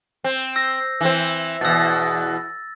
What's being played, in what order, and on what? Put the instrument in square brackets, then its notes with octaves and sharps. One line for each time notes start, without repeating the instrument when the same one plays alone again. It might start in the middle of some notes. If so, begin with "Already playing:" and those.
[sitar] C4
[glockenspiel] E6 A#6
[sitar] E3 C4 [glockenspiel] A#6
[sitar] E2 B2 [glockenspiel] E6 A6